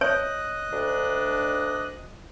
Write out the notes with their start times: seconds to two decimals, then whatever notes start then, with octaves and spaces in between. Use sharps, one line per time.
0.01 C#5 D#5 F#6
0.73 D2 D4